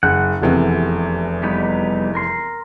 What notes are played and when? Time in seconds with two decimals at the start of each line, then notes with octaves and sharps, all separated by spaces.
0.03 F#1 F#5
0.42 F1 E2 C3
1.43 G3 B3 D#4
2.15 A#4 C6